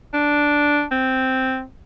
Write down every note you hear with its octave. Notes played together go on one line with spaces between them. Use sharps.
D4
C4